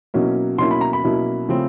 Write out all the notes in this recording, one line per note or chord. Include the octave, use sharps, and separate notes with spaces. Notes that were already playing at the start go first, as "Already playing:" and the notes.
B2 F#3 A#3 C#4 E4
B2 F#3 A#3 C#4 E4 C6
B5
A#5
B5
B2 F#3 A#3 C#4 E4
C#3 F3 A3 C4